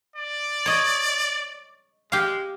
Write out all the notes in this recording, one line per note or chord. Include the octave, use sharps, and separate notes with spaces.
D5
C#5 D#5
G#3 G4 F5